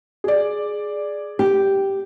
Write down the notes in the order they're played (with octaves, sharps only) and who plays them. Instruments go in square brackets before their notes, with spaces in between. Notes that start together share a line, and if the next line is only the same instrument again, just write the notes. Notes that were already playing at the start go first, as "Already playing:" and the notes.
[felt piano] G#4 D5
[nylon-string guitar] G4